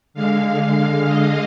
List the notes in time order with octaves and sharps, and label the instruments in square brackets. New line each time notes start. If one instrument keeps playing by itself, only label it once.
[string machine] D3 G#3 F5
F5
D#5